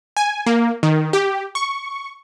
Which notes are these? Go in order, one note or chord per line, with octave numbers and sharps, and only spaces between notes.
G#5
A#3
D#3
G4
C#6